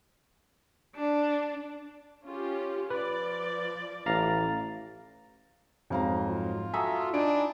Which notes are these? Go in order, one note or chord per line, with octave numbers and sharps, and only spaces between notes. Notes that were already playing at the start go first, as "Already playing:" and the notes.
D4
C#4 F4 G4
F3 B4 D5
A1 F5 A#5 A6
F2 G#2 F#3 F5 A#5
F4
F#4 A4 E5 G#5 A#5 D#6
D4 D#4 G#5 B5 D7